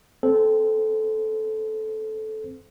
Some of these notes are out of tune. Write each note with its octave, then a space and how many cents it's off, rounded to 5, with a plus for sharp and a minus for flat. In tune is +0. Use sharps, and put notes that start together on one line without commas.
C4 +0 A4 -15 C5 -25